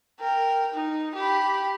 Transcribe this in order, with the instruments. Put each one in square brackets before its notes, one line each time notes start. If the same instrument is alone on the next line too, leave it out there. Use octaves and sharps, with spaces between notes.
[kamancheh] A#4 G5
D#4
G4 B5